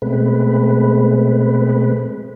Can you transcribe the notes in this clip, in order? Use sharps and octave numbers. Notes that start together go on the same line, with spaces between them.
B2 G#3 A3 C4 B4